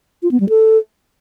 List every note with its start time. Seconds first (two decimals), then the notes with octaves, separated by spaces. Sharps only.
0.23 F4
0.31 B3
0.40 G3
0.49 A4